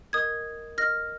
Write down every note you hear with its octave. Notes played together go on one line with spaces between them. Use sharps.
A#4 D#5 D#6 G#6
A#4 D#5 F6 A#6